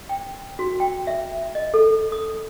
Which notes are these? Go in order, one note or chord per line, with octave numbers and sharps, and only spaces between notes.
G5
F#4
G5
E5
D#5
A4
D#6